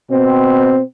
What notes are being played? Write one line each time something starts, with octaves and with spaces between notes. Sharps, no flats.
B2 C4